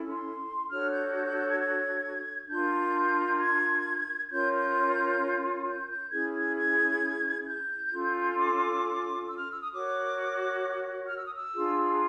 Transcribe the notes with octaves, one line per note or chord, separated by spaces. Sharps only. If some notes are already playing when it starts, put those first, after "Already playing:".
Already playing: C#4 E4 A4
C6
D4 F#4 A4 C#5 F6
G6
G6
G6
G6
G#6
G#6
D4 F4 A#4 G6
G#6
C#4 F4 A#4 C#5 G6
G6
G6
G6
C#4 E4 G#4 G#6
G#6
G#6
G6
C#4 F4 A4
D6
E6
F6
E6
D#6
F#4 A#4 C#5 D6
F6
E6
D#6
E6
D4 F4 G#4